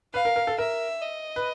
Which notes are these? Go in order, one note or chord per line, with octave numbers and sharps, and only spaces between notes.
B4 F5
A#4
A#4
A4
A#4 E5
D#5
B4